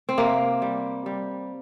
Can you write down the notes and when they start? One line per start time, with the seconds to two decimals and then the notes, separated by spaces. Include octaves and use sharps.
0.09 C4
0.18 C3 A#3
0.62 G3
1.06 G3